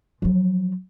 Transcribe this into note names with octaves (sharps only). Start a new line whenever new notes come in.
F3 F#3